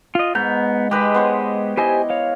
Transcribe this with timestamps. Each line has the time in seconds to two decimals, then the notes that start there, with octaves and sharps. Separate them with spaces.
0.15 F4 D#5
0.35 G#2 B3 A#5 G6
0.91 G#3 G4 B4 D#5
1.15 B3 C5 C#5
1.77 E4 G4 C5 D#5 G#5
2.10 C#5 F5